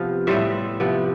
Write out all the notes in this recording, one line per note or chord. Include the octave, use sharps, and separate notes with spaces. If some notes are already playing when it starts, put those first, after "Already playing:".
Already playing: C3 F3 B3 F5
A2 G3 B3 C5 E5
C3 F3 B3